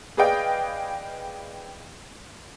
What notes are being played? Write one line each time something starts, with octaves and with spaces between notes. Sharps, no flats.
G#4 B4 D5 D#5 F5 G5